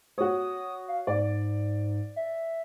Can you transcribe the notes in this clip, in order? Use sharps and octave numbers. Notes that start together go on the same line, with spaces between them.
F#4 C#5 D#6
F5
G#2 D5
E5